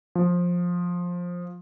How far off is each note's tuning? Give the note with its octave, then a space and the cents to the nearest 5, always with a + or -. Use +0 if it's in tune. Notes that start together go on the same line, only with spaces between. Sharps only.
F3 +15